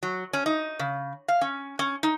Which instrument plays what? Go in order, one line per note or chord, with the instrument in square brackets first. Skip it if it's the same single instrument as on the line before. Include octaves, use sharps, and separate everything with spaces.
[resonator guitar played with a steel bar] F#3
C#4
D#4
C#3
F5
C#4
C#4
D#4